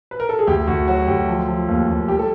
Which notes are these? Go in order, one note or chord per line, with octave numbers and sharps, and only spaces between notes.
B4
A#4
A4
G#4
D2 G4
D2 F#4
F#3 F#4
D2 G4
F3
F3
D#2
D#2
G3 G4
A4